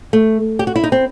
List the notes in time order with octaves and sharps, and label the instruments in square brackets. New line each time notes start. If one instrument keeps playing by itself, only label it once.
[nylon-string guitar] A3
G4
F#4
E4
D#4
C4